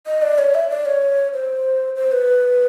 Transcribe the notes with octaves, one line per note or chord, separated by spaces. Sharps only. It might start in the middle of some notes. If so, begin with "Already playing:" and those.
D#5
D5
C#5
E5
D5
C#5
C5
C5
B4